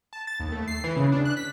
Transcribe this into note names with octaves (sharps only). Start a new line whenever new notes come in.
A5
A6
D#2
A3
C7
E3
C#3
D4
F#6
B6